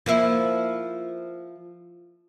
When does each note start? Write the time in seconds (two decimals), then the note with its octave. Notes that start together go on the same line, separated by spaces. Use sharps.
0.06 F3 A#3 E4